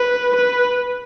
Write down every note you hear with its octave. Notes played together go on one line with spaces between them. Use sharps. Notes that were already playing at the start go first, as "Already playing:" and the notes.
Already playing: B4
B4